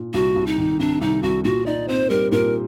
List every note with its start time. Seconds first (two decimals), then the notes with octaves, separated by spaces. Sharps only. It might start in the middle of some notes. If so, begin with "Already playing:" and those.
Already playing: A#2
0.14 C2 F#4
0.36 C2
0.47 D#4
0.58 D#3
0.79 C3 D4
1.01 C2 D#4
1.23 C2 F#4
1.44 A#2 F#4
1.66 D#4 D5
1.88 C4 C5
2.10 G3 A#4
2.32 A#2 A#4